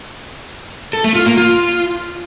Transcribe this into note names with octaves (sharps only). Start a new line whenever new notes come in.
A4
A3
F4
A#3
F4